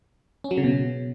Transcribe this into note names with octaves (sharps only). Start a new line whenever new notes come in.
C#4
F#3
C#3
B2